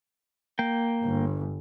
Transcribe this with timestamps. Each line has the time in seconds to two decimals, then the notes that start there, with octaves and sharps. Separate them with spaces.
0.59 A#3 G5
1.04 G1